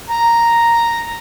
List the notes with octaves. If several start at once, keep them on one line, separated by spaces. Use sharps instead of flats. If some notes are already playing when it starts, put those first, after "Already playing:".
A#5